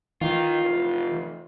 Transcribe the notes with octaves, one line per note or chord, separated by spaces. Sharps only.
D#3 E3 F4
F1